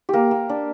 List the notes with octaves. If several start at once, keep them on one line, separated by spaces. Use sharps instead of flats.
A#3 G4 A#4
A#3
D4